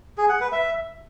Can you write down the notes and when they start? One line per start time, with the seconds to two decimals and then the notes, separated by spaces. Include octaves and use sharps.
0.18 G#4
0.29 F#5
0.41 B4
0.52 E5